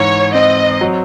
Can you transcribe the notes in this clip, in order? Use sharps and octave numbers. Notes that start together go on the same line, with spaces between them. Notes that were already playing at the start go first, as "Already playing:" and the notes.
Already playing: G#2 E3 C#5
C4 D#5
F#3